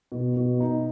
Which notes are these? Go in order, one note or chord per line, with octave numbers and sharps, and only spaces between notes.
B2
B2
D#4